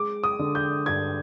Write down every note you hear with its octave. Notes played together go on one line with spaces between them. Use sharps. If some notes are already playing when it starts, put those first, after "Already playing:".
Already playing: G#3 D6
D#6
D3
G6
G2 G#6